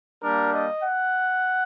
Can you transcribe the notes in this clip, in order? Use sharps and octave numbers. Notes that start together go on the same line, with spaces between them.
G3 A#3 D4 A#4
D#5
F#5